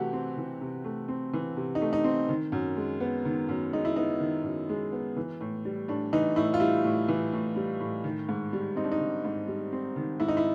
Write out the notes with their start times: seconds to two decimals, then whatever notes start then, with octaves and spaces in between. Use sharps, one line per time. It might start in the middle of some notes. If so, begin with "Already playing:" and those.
Already playing: C3 E3 A3 F#4 G4
0.13 C4
0.38 E3
0.61 C3
0.84 A3
1.08 C4
1.33 E3
1.56 C3
1.75 D#4
1.81 A3
1.93 D#4
2.04 C4
2.29 D#3
2.52 F#2
2.77 G#3
3.00 B3
3.25 D#3
3.49 F#2
3.73 G#3 D#4
3.85 E4
3.96 B3 D#4
4.20 D#3
4.44 F#2
4.69 G#3
4.92 B3
5.17 E3
5.41 A2
5.65 G3
5.88 A2 D4
6.13 E3 D#4
6.36 A2 E4
6.54 F4
6.60 G3 E4
6.84 A2
7.08 E3
7.33 A2
7.56 G3
7.80 A2
8.04 D#3
8.29 G#2
8.53 G3
8.76 C4 D#4
8.84 D4
8.92 D#4
9.00 D#3
9.25 G#2
9.48 G3
9.72 C4
9.96 D#3
10.20 G#2 E4
10.28 D#4
10.37 E4